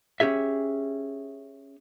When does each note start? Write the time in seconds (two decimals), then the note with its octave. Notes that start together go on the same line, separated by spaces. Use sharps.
0.20 C#4 G4 G#4 E5